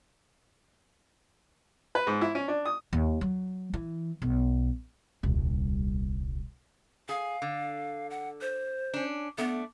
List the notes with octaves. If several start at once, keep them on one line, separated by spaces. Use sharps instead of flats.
B4
G#2
E4
C#4
D4
D#6
D#2
F#3
E3
B1
D#1 C2
G#4 F5
D3
F#5
C5
C#4 D4
A3 B3 D4